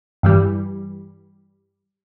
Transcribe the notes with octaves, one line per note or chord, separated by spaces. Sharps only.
G2 E3 G3